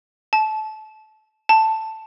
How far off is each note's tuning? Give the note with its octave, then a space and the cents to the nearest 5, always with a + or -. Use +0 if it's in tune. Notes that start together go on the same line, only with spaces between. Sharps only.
A5 -25
A5 +5